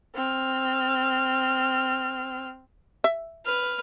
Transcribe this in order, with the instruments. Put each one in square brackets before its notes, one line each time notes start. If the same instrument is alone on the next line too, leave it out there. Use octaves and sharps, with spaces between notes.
[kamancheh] C4 F6
[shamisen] E5
[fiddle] B4 F6